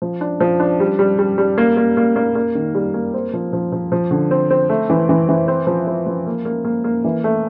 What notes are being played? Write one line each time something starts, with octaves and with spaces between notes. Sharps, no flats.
F3
D4
F3
D4
G3
G3
G3
G3
A#3
A#3
A#3
A#3
A#3
D#3
G3
A#3
C4
F3
F3
F3
F3
D3
C4
C4
A3
E3
E3
E3
C4
F3
C4
F3
A#3
A#3
A#3
A#3
E3
A3